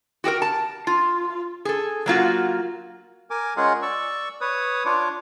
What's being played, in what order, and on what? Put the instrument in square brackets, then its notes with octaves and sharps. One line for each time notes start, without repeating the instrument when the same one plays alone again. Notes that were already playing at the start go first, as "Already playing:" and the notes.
[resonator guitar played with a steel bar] F#4 G4 A4 A#4
A5
F4
G#4 A4
F#3 A#3 F4 F#4
[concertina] A#4 G#5 D6
G#3 C#4 F4 G#4 A#4 F#5
D5 C#6 E6
B4 C#5 D#6
D4 F4 C#5 D6